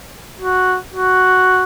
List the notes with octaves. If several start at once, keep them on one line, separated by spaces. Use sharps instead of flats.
F#4
F#4